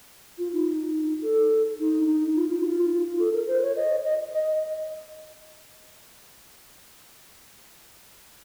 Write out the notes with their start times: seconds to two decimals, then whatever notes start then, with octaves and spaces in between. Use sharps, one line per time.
0.38 F4
0.53 D#4
1.23 A4
1.79 D#4
2.07 D#4
2.36 F4
2.50 D#4
2.63 F#4
2.67 F4
3.20 A4
3.33 A#4
3.48 C5
3.62 C#5
3.76 D#5
4.04 D#5
4.32 D#5